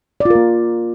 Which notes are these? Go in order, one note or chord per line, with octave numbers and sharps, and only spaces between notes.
A#3 F4 A#4 D5